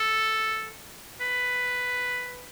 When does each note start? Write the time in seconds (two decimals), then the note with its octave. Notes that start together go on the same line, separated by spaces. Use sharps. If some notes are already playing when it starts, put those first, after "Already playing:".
Already playing: A4
1.21 B4